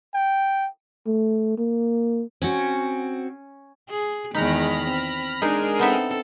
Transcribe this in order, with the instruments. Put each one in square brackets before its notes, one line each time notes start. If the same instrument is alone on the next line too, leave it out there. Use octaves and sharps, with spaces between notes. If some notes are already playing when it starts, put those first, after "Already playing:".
[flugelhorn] G5
[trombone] A3
A#3
[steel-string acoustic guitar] C4 F#4 [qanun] C#4
[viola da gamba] G#4
[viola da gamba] E2 D#3 G#3 [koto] D#4 [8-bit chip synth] B5 F6 A#6
[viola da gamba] C4
[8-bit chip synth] G#3 G#4 A#4 [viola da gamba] D4 [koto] D#4
[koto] B3 D#4 E5 [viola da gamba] C4 A4